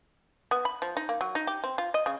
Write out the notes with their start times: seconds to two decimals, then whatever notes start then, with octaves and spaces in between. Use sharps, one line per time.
0.51 B3
0.65 B5
0.82 F3
0.97 D#4
1.09 A#3
1.21 F#3
1.35 D#4
1.47 G4
1.64 C4
1.78 F4
1.94 D#5
2.06 C#3